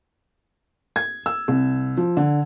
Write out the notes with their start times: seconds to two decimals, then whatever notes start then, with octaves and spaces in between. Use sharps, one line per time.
0.96 G#6
1.26 E6
1.48 C2
1.97 F3
2.17 D3